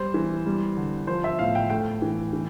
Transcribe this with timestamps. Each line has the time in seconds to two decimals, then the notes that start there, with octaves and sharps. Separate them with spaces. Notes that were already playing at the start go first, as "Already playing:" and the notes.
Already playing: G3 C5
0.14 E3
0.46 G3
0.77 D3
1.07 F3 C5
1.24 E5
1.39 A2 F5
1.55 G5
1.70 A3 G5
2.02 E3
2.33 E3